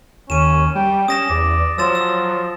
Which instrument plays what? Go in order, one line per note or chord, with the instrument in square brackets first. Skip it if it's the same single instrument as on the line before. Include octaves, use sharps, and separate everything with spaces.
[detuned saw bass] D#2 [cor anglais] C#4 [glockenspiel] D#7 E7
[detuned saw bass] G3 [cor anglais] G5
[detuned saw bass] C#4 [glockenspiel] D#6 A#6 E7
[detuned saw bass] E2 [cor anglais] D5
[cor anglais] F3 [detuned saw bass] F#3 [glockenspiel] E6 A6 E7
[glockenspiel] E6